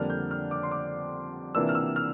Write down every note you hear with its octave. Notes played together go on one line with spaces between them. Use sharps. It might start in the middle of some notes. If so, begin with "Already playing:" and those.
Already playing: F2 D3 G3 A#3 D4 F6
G6
F6
D6
C6
D6
C3 E3 A#3 D4 F4 E6
F6
E6
F6